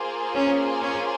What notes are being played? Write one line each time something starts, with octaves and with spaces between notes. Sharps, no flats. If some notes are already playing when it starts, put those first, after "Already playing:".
Already playing: A#3 F4 G#4 C5
C#4
C#4